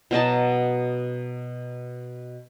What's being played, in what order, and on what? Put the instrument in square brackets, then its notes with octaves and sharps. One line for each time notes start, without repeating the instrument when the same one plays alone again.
[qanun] B2 F#3 D#5 A5